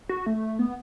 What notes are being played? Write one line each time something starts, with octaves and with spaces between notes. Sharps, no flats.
F#4
A3
B3